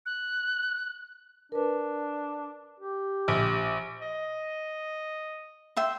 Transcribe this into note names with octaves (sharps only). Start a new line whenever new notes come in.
F#6
D4 A#4 B4
G4
A#1
D#5
E5 G5 C6